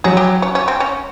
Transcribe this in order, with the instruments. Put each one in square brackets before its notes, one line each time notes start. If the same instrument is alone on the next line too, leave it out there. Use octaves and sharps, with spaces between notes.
[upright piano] F#3 [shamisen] G#4
[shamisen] G4
C#4
C#4
C4
C#4